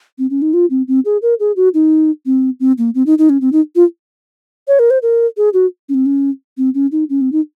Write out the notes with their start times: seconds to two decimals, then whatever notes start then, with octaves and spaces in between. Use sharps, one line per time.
0.19 C4
0.30 C#4
0.42 D#4
0.54 F4
0.70 C4
0.88 C4
1.05 G#4
1.22 A#4
1.40 G#4
1.56 F#4
1.74 D#4
2.26 C4
2.60 C4
2.78 A#3
2.95 C4
3.06 D#4
3.18 D#4
3.30 C#4
3.41 C4
3.52 D#4
3.76 F4
4.68 C#5
4.79 A#4
4.90 C5
5.02 A#4
5.37 G#4
5.54 F#4
5.89 C#4
5.94 C4
6.06 C#4
6.58 C4
6.75 C#4
6.92 D#4
7.10 C#4
7.21 C4
7.32 D#4